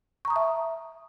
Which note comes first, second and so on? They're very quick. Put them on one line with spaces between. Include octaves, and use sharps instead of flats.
C#6 A#5 D#6 A5 E5